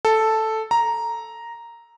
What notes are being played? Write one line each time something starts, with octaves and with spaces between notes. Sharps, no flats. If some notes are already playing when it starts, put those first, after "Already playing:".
A4
A#5